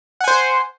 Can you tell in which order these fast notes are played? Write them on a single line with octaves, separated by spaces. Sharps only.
F#5 G#5 C5